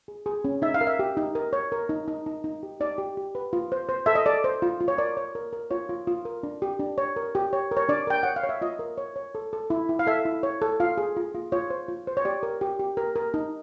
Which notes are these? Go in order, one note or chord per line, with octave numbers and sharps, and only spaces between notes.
G#4
G#4
C#4
D#4 E5
F5
A#4
E5
G4
D#4
A#4
C#5
A#4
D#4
D#4
D#4
D#4
G4
D#4 D5
G4
G4
B4
F4
C5
C5
A4 E5
D#5
A4 D5
C5
F4
F4
C#5
A#4 D5
C#5
A#4
A#4
F4 C#5
F4
F4
A#4
D4
G4
D4
C#5
A#4
G4
C#5
A#4
C#5
D4 D5
A#4 G5
C#5 F#5
F5
C#5
E5
F4 D#5
A#4
C#5
C#5
A4
A4
E4
E4
F5
A4 E5
E4
C#5
A4
F4 F5
G#4
F4
F4
F4 C#5
C5
F4
C5
C#5
G4 D5
A#4
G4
G4
A#4
A#4
D#4